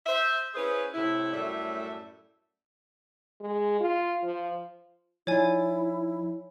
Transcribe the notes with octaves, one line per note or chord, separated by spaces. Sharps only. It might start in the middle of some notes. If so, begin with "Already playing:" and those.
C5 E5
C#4 E4 G#4 B4 C5
A2 C3 E4
F#2 A2 G3 A3 E5
G#3
F4
F3
F3 D#4 E4 C#5 D5 G#5